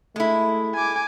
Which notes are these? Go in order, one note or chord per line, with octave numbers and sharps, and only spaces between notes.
G#3 A3 E4
G#5 D6